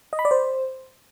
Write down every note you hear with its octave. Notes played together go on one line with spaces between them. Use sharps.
D#5
B5
D5
C5